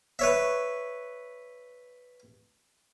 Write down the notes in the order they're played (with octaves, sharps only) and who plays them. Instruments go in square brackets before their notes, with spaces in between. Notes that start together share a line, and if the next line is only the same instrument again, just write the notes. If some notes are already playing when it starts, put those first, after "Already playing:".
[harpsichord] B4 C#5 E5